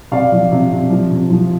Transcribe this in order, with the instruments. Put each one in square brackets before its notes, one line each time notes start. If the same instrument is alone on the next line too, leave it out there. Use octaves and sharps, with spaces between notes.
[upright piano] C3 D5 F5
F3
C3
C3
F3
C3
F3